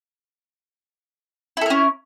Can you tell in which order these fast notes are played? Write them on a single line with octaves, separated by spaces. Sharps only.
E4 A4 A#4 C#4